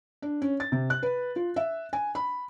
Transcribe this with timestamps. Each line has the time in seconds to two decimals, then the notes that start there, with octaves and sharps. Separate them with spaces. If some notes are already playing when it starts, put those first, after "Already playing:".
0.22 D4
0.42 C#4
0.60 A6
0.72 C3
0.90 F#6
1.03 B4
1.36 F4
1.56 E5
1.93 G#5
2.15 B5